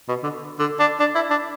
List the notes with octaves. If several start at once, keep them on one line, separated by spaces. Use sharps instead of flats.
B2
D3
D3
D4
D4
E4
D4